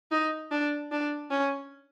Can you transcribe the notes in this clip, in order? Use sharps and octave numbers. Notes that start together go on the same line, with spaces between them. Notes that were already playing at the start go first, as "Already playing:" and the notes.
D#4
D4
D4
C#4